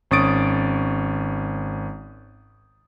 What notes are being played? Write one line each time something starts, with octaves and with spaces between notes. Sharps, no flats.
G#1 C#4 C#6 D#6 A6 D7